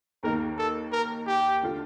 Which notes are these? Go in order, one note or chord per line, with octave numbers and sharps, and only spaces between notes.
D#2 D#3 A#3 D#4 A#4
A4
A#4
G4
D3 A3 D4 F4